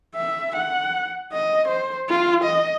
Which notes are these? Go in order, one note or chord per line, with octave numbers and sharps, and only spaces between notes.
E5
F#5
D#5
C5
F4
D#5